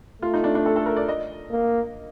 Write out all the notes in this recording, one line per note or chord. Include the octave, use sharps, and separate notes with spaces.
A3 F4
D#4
D4
D4
A4
A4
A#4
D5
D#5
A#3